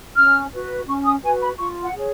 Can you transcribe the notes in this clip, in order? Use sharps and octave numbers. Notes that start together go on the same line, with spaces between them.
C#4 F6
F#4 B4
C#4 C#6
D#6
F#4 B4 G#5
B5
F4 C#6
F#5
G#4 C#5